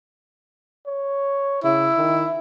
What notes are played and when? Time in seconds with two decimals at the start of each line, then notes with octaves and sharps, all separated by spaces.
0.86 C#5
1.64 C#3 E4
1.97 D#3